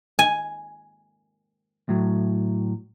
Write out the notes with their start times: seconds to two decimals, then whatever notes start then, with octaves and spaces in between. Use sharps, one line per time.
0.19 G#5
1.89 A2 F#3